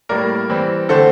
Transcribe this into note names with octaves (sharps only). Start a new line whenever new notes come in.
A2 G3 A#3 A#4 D5
E3 G3 C4
D3 A3 C4 A4 C5